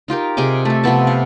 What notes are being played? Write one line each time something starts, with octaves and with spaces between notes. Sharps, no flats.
D#4 F4 G4 A#4
C3 G#4 D#5 D6
A3 A4
C3 F3 B3 A5
F5 F#5